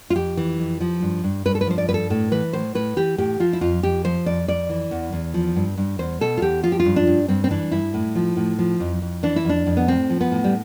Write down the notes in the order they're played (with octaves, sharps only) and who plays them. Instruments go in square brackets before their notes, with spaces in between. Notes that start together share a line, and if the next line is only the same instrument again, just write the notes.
[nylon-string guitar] F4
F2 G4
E3
F2
F3
G2
G2
G2 B4
A4
B4
F3 C5
D5
G2 B4
A4
A2 A4
E3 B4
A2 C5
A2 B4
E3 G4
A2 G4
F3 F4
E4
F2 F4
F2 G4
F3 C5
F2 D5
F2 D5
E3
E2
E2
F3
G2
G2
E2 C5
B2 A4
F4
E2 G4
F3 F4
G4
F4
G2
D4
G2
G2 C4
C4
E3 D4
G2 E4
A2
F3
A2
F3
F2
F2
E3 D4
E4
F2 D4
F2
B3
A2 C4
F3
B3
A2
G3